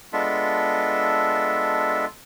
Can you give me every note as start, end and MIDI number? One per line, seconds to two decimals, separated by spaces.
0.13 2.05 56
0.13 2.05 59
0.13 2.05 62
0.13 2.05 65
0.13 2.05 69
0.13 2.05 76